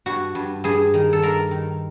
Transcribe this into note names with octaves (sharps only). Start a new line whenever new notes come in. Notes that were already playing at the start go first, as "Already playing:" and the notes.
G2 F#4
G2
G2 G#4
D#3
A4
G2 A#4
D#3